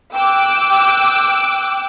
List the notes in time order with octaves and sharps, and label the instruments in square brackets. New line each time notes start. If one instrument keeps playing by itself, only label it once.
[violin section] G5 D6 E6 F#6